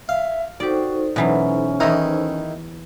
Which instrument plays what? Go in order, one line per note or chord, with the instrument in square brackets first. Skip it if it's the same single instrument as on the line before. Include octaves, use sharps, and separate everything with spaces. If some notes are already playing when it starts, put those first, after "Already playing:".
[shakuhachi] E5 [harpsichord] F5
[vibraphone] D#4 A4 C5 [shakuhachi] F#4 [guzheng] G4 D5
[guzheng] B2 E3 F#3 [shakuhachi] C#4
[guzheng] E2 A#5 [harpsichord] D#3 E4